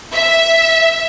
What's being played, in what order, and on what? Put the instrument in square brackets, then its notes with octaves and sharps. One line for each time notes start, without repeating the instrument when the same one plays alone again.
[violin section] E5